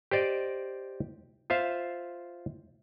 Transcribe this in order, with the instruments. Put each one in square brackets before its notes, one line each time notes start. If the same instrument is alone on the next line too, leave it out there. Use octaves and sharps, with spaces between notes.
[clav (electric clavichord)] G4 C5 D5 D#5
F4 C5 E5 F5